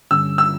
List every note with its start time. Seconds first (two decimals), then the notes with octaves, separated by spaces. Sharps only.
0.11 G2 D3 G3 C#4 E6
0.38 E6